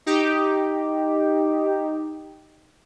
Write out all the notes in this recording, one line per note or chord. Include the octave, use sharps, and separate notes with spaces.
D#4 G4